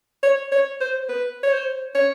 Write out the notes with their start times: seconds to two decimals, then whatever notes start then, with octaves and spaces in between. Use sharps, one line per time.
0.23 C#5
0.52 C#5
0.81 C5
1.09 B4
1.43 C#5
1.53 C5
1.95 C#5